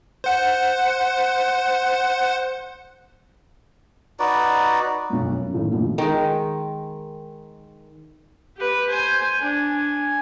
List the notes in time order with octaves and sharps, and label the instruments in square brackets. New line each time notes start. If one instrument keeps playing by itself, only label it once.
[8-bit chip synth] C5 F#5
[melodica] D#4 F#4 B4 D5
[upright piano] B1 F2
F#2
C#2 A2 D#3
A#1 B2
[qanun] D#3 G#3
[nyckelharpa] G4 B4
[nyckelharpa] C5 G#5 [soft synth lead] G6
[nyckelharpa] D4 [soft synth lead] G#5